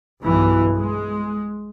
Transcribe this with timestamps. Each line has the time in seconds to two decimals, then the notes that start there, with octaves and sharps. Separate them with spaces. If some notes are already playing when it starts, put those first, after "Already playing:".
0.22 B1 G2 E3
0.78 G#3